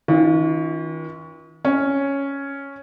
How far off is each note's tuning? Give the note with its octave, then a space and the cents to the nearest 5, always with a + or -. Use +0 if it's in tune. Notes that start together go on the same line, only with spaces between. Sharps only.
D#3 +45 C#4 +25 F4 +0
C#4 +0 C#5 +0